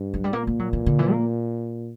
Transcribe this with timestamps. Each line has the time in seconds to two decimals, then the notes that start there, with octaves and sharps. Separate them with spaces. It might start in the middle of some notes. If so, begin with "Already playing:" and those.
Already playing: G2
0.14 F#3
0.24 G3
0.33 A#2 A#3
0.47 A#3
0.59 F#3
0.73 E3
0.86 D3
0.99 E3
1.12 A#3